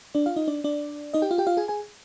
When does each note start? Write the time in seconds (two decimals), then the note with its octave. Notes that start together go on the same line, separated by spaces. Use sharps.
0.15 D4 D5
0.26 F4 F5
0.36 D#4 D#5
0.48 D4 D5
0.64 D4 D5
1.14 D#4 D#5
1.22 G4 G5
1.31 F4 F5
1.38 G4 G5
1.47 F4 F5
1.57 G#4 G#5
1.68 G#4 G#5